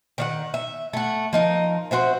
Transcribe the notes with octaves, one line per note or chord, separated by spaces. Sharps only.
D#3 D5 F#5
E5
A3 F#5
F3 D#4 A#4
C4 F#4 C5 E5